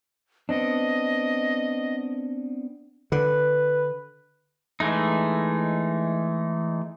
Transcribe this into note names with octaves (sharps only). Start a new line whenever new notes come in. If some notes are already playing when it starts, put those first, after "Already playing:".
B3 C4 D4 D#5
D3 B4
E3 G#3 A3 D#4